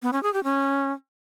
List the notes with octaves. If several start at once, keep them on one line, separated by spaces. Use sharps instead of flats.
B3
C#4
G#4
G4
C#4